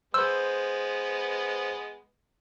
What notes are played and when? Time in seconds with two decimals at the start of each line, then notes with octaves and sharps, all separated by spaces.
0.14 G#3 B3 B4 C5 E6